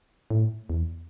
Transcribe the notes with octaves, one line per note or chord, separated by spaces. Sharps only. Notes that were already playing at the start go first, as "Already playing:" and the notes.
A2
E2